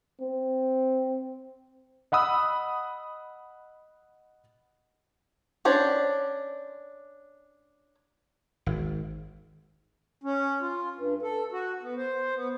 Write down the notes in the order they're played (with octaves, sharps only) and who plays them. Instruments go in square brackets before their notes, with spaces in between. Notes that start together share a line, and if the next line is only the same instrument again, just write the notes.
[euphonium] C4
[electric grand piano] D#5 F#5 B5 D#6 E6
[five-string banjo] C#4 D4 C5 D5
[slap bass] G#1
[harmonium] C#4
F4
G2
A4
F#4
B3
C5
B3